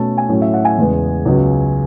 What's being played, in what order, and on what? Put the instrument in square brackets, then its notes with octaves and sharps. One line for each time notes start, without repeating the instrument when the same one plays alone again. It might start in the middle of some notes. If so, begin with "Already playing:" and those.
Already playing: [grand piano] B2 A3 C#4 A5
G#5
A2 F#3 C#4
E5
F#5
G#5
E2 C#3 G#3 B3
C#2 C#3 F#3 B3